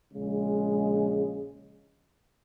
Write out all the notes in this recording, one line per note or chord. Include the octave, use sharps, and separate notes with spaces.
A#1 C#3 G#3